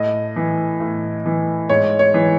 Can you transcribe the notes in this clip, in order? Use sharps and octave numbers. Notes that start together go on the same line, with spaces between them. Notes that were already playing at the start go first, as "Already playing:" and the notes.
Already playing: A2 D#5
E3
A2
E3
G#2 C#5
C#5
E3